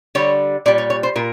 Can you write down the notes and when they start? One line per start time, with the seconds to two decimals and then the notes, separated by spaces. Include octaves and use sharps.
0.15 D3 G3 C#5
0.66 A#2 G3 D5
0.78 C#5
0.90 C#5
1.03 C5
1.16 A#2 A#4